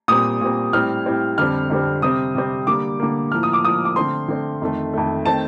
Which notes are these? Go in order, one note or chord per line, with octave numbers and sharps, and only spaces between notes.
A#2 G3 C4 D#6
A#2 G3 C4
A2 G3 C4 F6
A2 G3 C4
F2 D3 G3 C4 F6
F2 D3 G3 C4
C3 G3 C4 D#6
C3 G3 C4
D3 G3 A#3 D6
D3 G3 A#3
A2 F3 A#3 F6
D#6
D6
A2 F3 A#3 D#6
D6
D3 A3 C4 C6
D3 A3 C4
F2 D#3 A3
F2 D#3 A3
D#3 A3 C4 A5